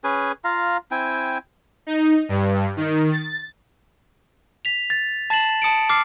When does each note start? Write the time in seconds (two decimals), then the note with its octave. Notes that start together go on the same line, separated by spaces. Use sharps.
0.04 C#4 G#4 B4 G#5
0.44 F4 F5 A#5
0.91 C4 E4 G5 G#5
1.87 D#4
2.29 G2
2.77 D#3
3.11 A6
4.65 B6 F7
4.90 A6
5.30 A5 A6 C7 E7 F#7
5.62 A5 D#6 C#7 D7
5.89 D6 F6 A6 C7